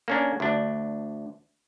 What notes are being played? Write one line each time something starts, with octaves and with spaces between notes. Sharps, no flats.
A#3 C#4 D4
D2 D4